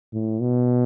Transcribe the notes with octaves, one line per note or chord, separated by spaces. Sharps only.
A2
B2